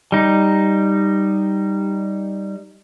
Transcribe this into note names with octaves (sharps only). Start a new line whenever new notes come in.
G3 D#4